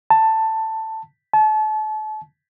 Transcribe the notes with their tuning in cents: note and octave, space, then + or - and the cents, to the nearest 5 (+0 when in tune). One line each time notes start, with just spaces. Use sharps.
A5 +10
A5 -35